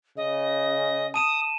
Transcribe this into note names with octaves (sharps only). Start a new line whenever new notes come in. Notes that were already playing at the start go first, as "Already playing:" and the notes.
C#3 D#5
A5 D#6 D#7 E7